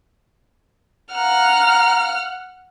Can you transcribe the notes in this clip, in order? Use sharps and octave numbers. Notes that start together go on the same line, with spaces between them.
F5 F#5 A#5 F6